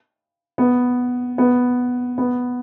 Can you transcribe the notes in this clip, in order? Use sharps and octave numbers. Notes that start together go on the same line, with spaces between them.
B3
B3
B3